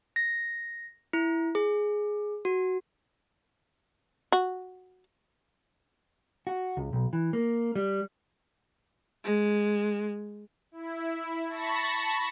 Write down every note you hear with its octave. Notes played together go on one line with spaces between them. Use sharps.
A#6
E4
G#4
F#4
F#4
F#4
C#2
B1
E3
A#3
G3
G#3
E4
A5 B5 C#6 A#6